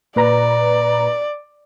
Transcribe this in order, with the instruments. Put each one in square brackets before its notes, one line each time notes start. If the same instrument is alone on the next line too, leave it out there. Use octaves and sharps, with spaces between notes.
[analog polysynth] A#2 B4 A#5 [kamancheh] D5